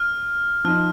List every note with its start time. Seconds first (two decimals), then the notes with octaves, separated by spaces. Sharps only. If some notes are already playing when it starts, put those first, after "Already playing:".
Already playing: F6
0.64 F3 D#4 F6